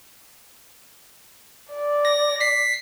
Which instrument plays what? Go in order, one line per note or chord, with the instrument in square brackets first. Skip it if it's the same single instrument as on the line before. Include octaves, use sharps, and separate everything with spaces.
[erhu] D5
[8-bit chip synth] A#6
B6 C7